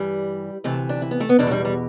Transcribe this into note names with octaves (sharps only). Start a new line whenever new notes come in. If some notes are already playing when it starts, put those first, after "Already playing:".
Already playing: G2 E3 G3
D2 C3 E3 A3
D4
E4
B3
A3
B3
E2 B2 D4
A3
G3
G3